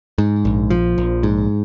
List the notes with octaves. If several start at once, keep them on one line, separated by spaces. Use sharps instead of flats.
G#2
A#1
F3
A#1
G#2